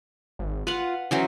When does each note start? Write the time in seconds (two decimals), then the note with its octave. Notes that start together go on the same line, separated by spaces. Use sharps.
0.39 G#1
0.67 F4 B4 F5 F#5
1.11 E3 F#3 C#4 C5